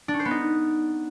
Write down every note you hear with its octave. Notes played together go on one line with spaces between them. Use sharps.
D4
C#4
C5
B3
D#4